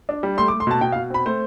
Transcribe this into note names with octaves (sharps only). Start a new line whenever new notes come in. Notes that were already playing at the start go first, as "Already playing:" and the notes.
D4
G3
A3 C6
D6
A3
C6
B2 A5
B2 G5
F5
B2
C4 B5
A3 C5